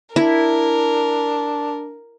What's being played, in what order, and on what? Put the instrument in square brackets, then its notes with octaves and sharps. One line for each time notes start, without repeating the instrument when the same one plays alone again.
[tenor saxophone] D4 [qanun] E4 [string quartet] A#4